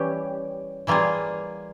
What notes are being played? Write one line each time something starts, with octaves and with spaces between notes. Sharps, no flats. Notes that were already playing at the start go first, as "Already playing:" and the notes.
Already playing: E3 G3 C#4 G4
E3 G3 A#3 F4 G#4